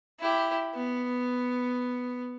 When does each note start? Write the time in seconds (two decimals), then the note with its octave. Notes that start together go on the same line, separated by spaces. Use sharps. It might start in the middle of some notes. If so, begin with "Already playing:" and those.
0.20 E4 G4
0.75 B3